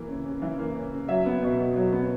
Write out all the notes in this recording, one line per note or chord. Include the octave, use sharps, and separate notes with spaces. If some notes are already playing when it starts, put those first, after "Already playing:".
Already playing: E3 A#3
C#3
C#3
E3
A#3
C#3
C#3
F#3 E5
B3
B2
B2
F#3
B3